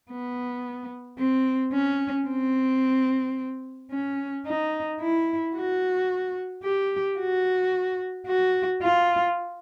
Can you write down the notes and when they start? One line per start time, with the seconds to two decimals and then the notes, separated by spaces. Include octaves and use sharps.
0.11 B3
1.19 C4
1.73 C#4
2.28 C4
3.91 C#4
4.46 D#4
5.00 E4
5.55 F#4
6.64 G4
7.19 F#4
8.27 F#4
8.82 F4